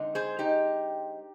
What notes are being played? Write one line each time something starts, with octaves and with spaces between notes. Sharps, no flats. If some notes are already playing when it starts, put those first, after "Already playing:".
Already playing: D3 G#3 C4 D#4
G#4 C5
D#4 G4